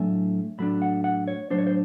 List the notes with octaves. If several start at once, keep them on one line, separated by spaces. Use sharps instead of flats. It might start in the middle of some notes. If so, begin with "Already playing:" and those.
Already playing: A2 F#3 A3 D4 G#5
A2 F#3 A3 D4 B5
F#5
F#5
C#5
A2 F#3 A3 D4 C5
C#5
C5